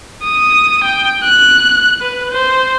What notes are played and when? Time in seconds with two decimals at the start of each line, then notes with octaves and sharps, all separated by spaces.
0.24 D#6
0.84 G5
1.23 F#6
2.01 B4
2.32 C5